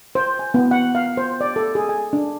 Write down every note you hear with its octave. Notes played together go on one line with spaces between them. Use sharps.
C5
G#5
B3
F#5
F5
C5
D5
A4
G#4
G#5
D4